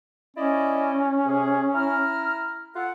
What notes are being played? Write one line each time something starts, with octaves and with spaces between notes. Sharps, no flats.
C#4 E4 D5 D#5
C3 G#4
E4 A#5 F6
F4 A4 F#5